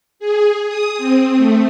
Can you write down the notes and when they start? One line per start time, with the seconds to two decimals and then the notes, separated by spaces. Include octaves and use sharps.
0.19 G#4
0.68 D#6
0.98 C4
1.37 A3